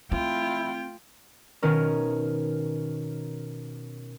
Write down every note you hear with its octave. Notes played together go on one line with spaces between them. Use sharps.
A3 C4 E4 F4 G5
B2 D#3 C#4 A#4